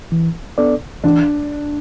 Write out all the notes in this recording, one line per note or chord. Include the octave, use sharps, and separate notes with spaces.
E3
B3 D4 A4 D5
E3 D4